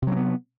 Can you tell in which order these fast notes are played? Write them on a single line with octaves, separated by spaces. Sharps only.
C3 F#3 C4 B3